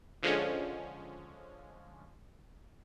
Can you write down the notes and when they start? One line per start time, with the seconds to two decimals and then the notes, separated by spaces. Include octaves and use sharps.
0.23 D3 F3 G#3 C#4